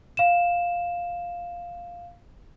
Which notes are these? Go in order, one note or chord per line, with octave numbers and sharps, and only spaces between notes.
F5 E7